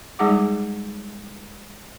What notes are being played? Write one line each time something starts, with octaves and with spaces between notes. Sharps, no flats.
G3 G#3 D#4 G#4 F#5 D6